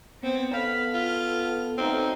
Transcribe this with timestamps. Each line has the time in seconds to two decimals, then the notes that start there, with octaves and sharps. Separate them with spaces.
0.23 B3 C4
0.54 B3 A4 F5 B5
0.94 F4 F6
1.78 F#3 A3 C4 D#4